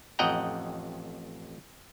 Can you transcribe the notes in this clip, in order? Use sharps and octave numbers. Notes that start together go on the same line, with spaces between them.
A1 F2 D#5 F#5 G5 A#5